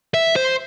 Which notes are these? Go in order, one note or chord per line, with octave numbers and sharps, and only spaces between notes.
E5
C5